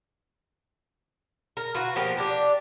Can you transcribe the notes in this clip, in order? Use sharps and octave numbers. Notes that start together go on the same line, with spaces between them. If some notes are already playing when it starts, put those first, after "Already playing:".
A#4
F4 F#4 B4
F3 A#3 B3 G4
D4 G4